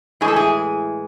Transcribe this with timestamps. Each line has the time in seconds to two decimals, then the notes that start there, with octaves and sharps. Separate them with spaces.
0.21 A2 E3 G#3 G#4
0.28 A4
0.36 G#4